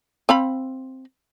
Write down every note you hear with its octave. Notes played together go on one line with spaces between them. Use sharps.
C4 F5 B5